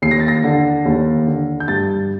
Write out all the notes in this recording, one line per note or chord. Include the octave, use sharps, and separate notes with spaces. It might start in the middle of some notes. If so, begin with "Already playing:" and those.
D#2 C7
A#6
A6
A#6
D3
D#2
D3
G6
G2 A6